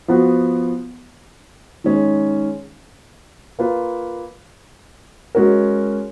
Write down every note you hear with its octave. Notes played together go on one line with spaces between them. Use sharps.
F3 B3 F#4
D#3 G#3 C#4
A#3 F4 B4
G#3 C#4 F#4 A#4